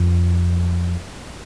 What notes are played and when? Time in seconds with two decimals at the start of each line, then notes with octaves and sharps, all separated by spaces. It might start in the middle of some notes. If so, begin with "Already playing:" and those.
Already playing: F2